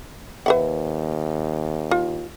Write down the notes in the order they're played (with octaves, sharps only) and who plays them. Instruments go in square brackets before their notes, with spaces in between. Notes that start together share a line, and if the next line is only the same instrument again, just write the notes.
[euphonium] D#2 [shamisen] B4 E5 F#5
[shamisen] F4